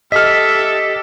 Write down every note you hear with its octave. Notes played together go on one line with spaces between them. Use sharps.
G4 A4 D#5 E5 F6 B6